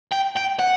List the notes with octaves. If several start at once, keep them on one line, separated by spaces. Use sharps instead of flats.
G5
G5
F#5